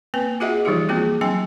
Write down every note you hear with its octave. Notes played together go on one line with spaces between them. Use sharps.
A#3 C4 B4 G#5
F4 F#4 G#4 D#5 E5 F#5
E3 F3 G3 D#4 F4 G4
A#3 C4 F4 F#4 G#4
F#3 C4 D4 G5 G#5